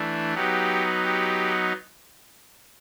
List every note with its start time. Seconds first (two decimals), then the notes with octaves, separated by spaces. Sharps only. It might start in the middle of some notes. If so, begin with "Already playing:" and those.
Already playing: E3 A3 D4
0.34 F#3 B3 D#4 G4
1.03 G4